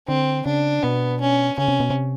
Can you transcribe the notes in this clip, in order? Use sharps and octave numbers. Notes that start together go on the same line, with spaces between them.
D3 C4
C#3 D4
B2 B3
C#4
C#3 C#4
C3
B2
C3